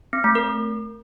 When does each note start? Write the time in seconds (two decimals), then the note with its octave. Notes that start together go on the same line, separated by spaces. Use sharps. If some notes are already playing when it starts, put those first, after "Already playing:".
0.13 C4
0.24 A3
0.35 A#4